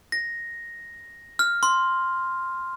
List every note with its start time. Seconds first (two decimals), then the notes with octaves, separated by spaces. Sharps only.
0.12 A#6
1.39 F6
1.63 C6